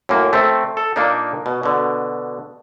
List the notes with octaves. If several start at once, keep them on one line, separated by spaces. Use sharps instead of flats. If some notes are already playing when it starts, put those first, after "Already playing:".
F#2 A2 F#3 A#3
A3 C4
A4
A#2 A#3 D4 D#4
B2
B2 D3